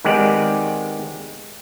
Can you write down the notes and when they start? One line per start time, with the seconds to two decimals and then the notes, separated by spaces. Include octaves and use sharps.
0.05 D#3 G#3 B3 C4 G4 D5